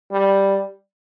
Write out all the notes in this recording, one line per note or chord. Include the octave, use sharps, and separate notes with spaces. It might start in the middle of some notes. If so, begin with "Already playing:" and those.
G3